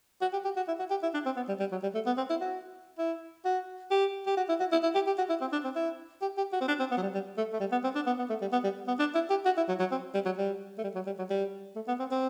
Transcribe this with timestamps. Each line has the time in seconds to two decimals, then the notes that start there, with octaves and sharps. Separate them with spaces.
0.22 F#4
0.33 G4
0.44 G4
0.57 F#4
0.68 E4
0.79 F#4
0.90 G4
1.03 E4
1.14 D4
1.26 C4
1.37 B3
1.48 G3
1.60 G3
1.72 F#3
1.83 G3
1.95 A3
2.06 B3
2.17 C4
2.30 E4
2.41 F#4
2.98 E4
3.45 F#4
3.91 G4
4.26 G4
4.37 F#4
4.49 E4
4.60 F#4
4.72 E4
4.83 E4
4.95 G4
5.07 G4
5.18 F#4
5.29 E4
5.41 C4
5.53 D4
5.64 C4
5.76 E4
6.22 G4
6.37 G4
6.52 F#4
6.61 C4
6.68 D4
6.79 C4
6.91 B3
6.98 F#3
7.03 G3
7.14 G3
7.38 A3
7.53 A3
7.60 G3
7.72 B3
7.84 C4
7.95 D4
8.06 B3
8.19 B3
8.30 A3
8.41 G3
8.52 B3
8.64 G3
8.88 B3
8.99 D4
9.14 E4
9.30 G4
9.45 F#4
9.57 E4
9.69 F#3
9.79 F#3
9.91 C4
10.15 G3
10.26 F#3
10.38 G3
10.78 A3
10.84 G3
10.95 F#3
11.07 G3
11.18 F#3
11.30 G3
11.76 A3
11.88 B3
12.00 C4
12.11 C4